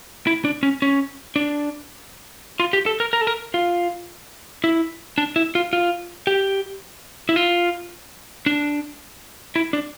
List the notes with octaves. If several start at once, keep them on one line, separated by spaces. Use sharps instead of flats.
E4
D4
C#4
C#4
D4
F4
G4
A4
A#4
A#4
A4
A#4
F4
E4
D4
E4
F4
F4
G4
E4
F4
D4
E4
D4